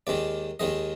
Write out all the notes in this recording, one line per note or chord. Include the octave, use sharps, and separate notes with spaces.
D#2 D#3 G#3 D5
D#2 D#3 G#3 D#5